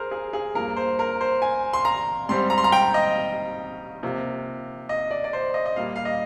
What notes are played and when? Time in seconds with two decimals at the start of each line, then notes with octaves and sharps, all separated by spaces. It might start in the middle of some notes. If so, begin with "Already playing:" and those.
Already playing: G#4 A#4 C5
0.11 G#4
0.33 G#4
0.55 G2 F3 A#3 A#4
0.76 C5
0.99 A#4
1.21 C5
1.42 G#5
1.73 C6
1.85 A#5
2.29 G#2 G3 C4 C6
2.50 A#5
2.58 C6
2.64 A#5
2.72 G5
2.94 D#5
4.03 C3 F3 A#3
4.89 D#5
5.11 D5
5.24 D5
5.33 C5
5.54 D#5
5.66 D#5
5.76 A#2 G3 A#3 F5
5.96 F5
6.05 D#5